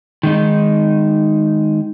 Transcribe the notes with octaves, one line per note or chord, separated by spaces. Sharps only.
D#3 G#3 D#4